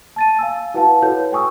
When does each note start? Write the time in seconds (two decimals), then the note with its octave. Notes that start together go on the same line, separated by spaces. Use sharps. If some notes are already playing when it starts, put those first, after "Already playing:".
0.16 A5 A6 D#7
0.39 F5 G#5 E6
0.74 E4 F#4 B4 F5 F#5 A5
1.02 E4 F#4 A4 B4 C#5 G6
1.32 G5 G#5 C#6 D#6 E6